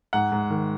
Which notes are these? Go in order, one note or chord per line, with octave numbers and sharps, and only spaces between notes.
G#2 F#5
G#2
D#3